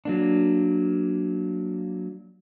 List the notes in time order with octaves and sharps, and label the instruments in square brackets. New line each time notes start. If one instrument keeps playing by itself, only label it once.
[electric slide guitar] F#3 A#3 D4